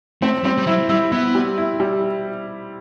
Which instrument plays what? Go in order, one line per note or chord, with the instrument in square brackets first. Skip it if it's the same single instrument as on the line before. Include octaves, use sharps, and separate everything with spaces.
[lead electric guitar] A3 [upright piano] C4
[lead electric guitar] G3 [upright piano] C4
[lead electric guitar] G3
[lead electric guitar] F#3 [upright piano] E4
[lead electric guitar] G3 [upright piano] E4
[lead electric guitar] B3 [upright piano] E4
[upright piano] G3
E4
G3